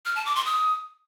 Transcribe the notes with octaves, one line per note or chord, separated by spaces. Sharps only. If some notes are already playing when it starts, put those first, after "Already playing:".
F6
A5
D6
C6
D#6